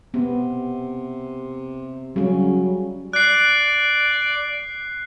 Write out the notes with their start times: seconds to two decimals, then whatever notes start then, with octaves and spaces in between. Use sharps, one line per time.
0.14 C3 B3
2.16 C#3 F#3 G3 C#4
3.13 D5 F#6 C7